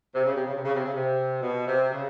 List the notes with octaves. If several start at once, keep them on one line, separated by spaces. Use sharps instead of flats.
C3
C#3
C3
C#3
C3
C#3
C3
C#3
C3
B2
C3
C#3